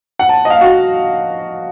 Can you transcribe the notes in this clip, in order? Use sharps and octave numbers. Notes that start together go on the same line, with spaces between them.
F#5
A5
D#5
F5
F#4